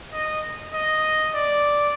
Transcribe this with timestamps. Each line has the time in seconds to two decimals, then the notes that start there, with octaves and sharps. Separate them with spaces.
0.14 D#5
0.74 D#5
1.35 D5